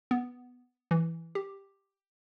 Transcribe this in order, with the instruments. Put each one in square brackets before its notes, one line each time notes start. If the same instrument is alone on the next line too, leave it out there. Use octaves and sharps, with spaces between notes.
[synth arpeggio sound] B3
E3
G4